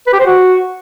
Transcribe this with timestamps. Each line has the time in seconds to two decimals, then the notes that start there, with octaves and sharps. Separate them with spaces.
0.07 B4
0.13 G4
0.19 C5
0.26 F#4